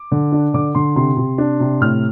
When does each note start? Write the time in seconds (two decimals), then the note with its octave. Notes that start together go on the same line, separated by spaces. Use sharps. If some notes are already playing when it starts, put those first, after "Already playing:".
Already playing: D6
0.11 D3
0.32 D4
0.54 D3 D6
0.75 D3 C6
0.96 C3 C6
1.17 C3
1.38 D4
1.60 C3
1.81 A2 F6